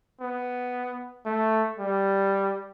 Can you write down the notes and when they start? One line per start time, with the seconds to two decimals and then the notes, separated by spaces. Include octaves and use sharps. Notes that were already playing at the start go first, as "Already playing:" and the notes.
0.21 B3
1.26 A3
1.79 G3